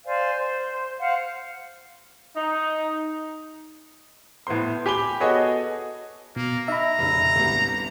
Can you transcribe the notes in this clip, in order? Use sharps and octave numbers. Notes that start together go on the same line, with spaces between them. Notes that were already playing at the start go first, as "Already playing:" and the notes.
C5 D5 F5 G#5
C5
C5 F5 F#5
D#4
A2 B3 C5 C6
G4 G#5 B5 D6 G7
B3 F#4 G#4 A4 C#5 D#5
B2 A#3
D#4 E5 A#5 B5
F1 C#3
G1 C2